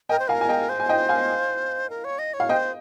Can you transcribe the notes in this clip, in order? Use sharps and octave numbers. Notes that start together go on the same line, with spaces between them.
A#4 D#5 G5
C5
A#4 F5 G#5
G#5
D#5 G5
C5
G#5
D#5 G5
F5 G#5
A#4
C#5
D#5
C#5
F5
C5 D#5 G5